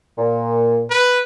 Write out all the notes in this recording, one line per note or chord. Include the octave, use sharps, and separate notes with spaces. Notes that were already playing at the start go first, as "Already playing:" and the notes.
A#2
B4